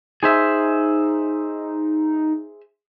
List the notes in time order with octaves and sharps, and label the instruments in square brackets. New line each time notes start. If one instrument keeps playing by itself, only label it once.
[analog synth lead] D#4 [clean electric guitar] G#4 C5 E5